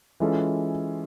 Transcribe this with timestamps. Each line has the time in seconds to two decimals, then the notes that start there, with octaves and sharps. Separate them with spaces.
0.20 E3 G#3 C#4 F4 A4